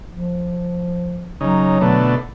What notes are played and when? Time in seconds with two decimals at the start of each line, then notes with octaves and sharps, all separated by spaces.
0.12 F3
1.41 C#3 F#3 D#4
1.81 B2 D3 A3